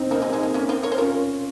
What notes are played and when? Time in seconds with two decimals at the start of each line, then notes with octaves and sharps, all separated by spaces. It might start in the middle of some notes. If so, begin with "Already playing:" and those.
Already playing: C4 D#4
0.11 A#3 C4 D#4
0.22 G#3
0.33 G#3
0.43 A#3
0.54 A#3 C#4
0.69 C4 D#4
0.83 A#4 C#5
0.92 C5
0.98 C#4 F4 A#4 C#5